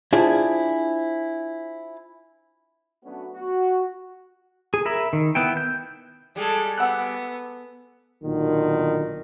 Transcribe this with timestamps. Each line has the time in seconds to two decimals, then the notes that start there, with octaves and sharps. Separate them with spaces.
0.13 D4 E4 F4 G#4 C5 D5
3.03 F#3 A3 B3 C#4 D4 F#4
3.33 F#4
4.74 G#4
4.85 A#4 E5 B5
5.13 D#3
5.35 B3 E4 G5
5.57 G6
6.36 G3 G#3 G#4 A4
6.78 B3 F#5 E6 F#6
8.23 B1 A#2 D3 D#3